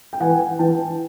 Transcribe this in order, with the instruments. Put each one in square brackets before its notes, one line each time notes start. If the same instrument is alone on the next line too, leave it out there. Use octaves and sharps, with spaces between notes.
[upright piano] G5
[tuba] E3 [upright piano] F#5 G#5
[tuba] E3 [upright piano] G5 A5